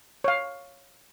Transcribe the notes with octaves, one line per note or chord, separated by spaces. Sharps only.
C#5 F5